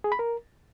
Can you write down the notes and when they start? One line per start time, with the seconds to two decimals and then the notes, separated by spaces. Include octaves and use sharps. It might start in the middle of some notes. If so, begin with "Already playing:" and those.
0.04 G#4
0.12 B5
0.19 A#4